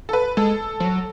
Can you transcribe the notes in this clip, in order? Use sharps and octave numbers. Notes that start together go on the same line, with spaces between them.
A4
B4
G#3 A4
F3
F#3